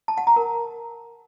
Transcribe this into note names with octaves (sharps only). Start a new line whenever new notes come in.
A5
F#5
A#5
A#4